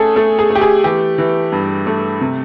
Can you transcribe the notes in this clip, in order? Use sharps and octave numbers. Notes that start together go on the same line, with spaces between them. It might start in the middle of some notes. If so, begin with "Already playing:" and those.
Already playing: A3 C#4 G#4 A4
A3 A4
G#4
A3
G4
G#4
E3 G4
E3
G2
A3
C3